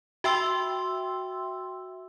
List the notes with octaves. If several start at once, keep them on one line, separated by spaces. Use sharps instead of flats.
F#4 E5 G5 C6 E6